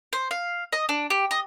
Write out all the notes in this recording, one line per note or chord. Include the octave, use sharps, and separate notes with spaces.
C5
F5
D#5
D4
G4
D#5